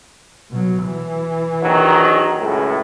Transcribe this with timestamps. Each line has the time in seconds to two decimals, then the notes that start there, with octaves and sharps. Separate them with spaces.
0.51 B2 F#3
0.84 E3
1.62 A#1 D#3 F#3
2.38 C#2 F#2 A2